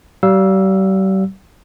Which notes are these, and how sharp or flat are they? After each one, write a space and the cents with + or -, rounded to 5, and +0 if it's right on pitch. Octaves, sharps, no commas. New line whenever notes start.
G3 -40 F5 +0 E6 +0